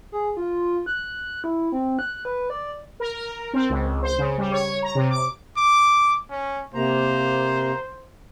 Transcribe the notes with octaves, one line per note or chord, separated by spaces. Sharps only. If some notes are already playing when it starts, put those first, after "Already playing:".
G#4
F4
F#6
E4
C4
F#6
B4
D5
A#4
A#4
C4
C#2
C5
C#3
G3
C#5
A#5
C3
D6
D6
C#4
C3 A#3 C5 A#5